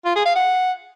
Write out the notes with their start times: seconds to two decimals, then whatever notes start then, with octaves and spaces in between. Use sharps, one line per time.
0.06 F4
0.16 G#4
0.26 F5
0.36 F#5